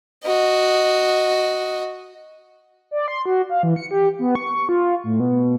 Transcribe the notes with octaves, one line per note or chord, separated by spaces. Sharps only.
F#4 D#5
D5
C6
F#4
F5
E3
C#7
G4
B3
C#6
F4
A2
B2